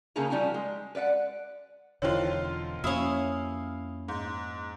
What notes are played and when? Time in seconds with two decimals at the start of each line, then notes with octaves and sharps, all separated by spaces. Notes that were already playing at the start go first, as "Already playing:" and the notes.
0.16 C#3 A#3 D#4 E4 G#4 A#5
0.30 F3 G3 D#4 F#4 G#5
0.54 G#3
0.95 B4 D5 E5 F#5
2.02 E1 D3 D#3 C#4 F4 C5 C#5
2.84 F2 A#3 C#4 E4 F#4 F5 D#6
4.08 G#2